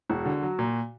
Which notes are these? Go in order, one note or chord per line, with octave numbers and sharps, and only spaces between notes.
E1 F#4
D3
F#3
A#2